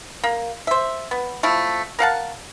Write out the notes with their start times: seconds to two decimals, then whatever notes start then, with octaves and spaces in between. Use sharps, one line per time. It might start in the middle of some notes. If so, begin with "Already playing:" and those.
0.24 A#3
0.67 C5 E5
1.11 B3
1.43 F3 A3 E4
1.99 A#4 F5 F#5 A5